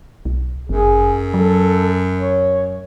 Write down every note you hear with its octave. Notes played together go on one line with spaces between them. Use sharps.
B1
G1 F#2 G#4
F#3 A4
C#5